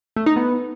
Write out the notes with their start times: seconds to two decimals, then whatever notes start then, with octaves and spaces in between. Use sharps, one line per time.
0.16 A3
0.26 D#4
0.36 B3